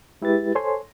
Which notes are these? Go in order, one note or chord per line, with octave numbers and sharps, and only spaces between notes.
G#3 E4 G4 B4 A6
A4 C5 C#5 G#5 C6